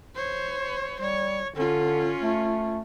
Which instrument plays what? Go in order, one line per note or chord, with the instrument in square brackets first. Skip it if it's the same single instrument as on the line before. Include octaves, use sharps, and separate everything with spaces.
[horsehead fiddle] C5 C#5
[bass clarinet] G3 [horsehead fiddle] C#5
[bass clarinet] D3 [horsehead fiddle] C#4 F4
[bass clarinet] A3